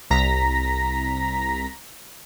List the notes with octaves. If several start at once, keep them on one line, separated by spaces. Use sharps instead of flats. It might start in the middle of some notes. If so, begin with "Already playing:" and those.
C2 A#5 A#6 B6